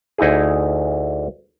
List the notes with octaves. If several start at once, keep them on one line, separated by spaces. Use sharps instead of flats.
D2 D#4 E4 G#4